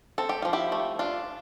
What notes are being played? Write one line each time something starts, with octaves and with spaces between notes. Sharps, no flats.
C4 A4
G4
F3 F4
E4 G4
A3
D4 F4